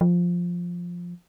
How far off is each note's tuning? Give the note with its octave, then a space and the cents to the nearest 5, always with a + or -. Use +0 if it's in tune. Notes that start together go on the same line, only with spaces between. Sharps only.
F3 +5